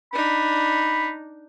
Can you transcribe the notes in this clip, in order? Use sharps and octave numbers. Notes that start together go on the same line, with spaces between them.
D4 D#4 B5